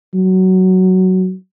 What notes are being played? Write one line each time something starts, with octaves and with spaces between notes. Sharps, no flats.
F#3